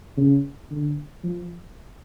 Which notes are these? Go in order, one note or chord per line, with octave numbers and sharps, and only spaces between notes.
C#3
D3
F3